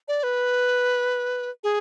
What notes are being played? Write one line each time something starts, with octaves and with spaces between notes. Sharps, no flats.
D5
B4
G#4